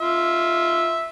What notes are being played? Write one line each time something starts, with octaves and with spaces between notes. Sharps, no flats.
F4 E5